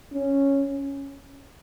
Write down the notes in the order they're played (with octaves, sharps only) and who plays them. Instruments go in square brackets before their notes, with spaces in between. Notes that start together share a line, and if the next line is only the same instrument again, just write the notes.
[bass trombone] C#4